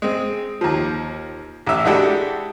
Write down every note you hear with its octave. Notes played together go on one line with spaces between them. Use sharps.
G#3 C4
D#2 F3
A1 E5
G#3 D4 E4 F#4 G4 A4